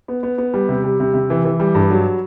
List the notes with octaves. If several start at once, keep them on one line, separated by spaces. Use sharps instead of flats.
B3
B3
B3
G3
C3
G3
C3
C3
E3
E3
G3
G2
F#3